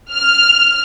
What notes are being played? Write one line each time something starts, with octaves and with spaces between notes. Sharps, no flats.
F6